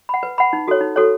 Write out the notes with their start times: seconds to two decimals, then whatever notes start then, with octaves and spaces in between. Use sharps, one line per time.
0.09 F#5 B5
0.23 B4
0.38 F#5 B5
0.53 D#4
0.68 F#4 A4 C#5
0.81 D#4
0.96 F#4 A4 C#5